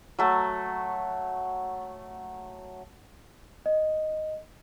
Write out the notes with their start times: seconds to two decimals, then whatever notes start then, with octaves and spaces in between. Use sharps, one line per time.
0.19 F#3 A3
3.66 D#5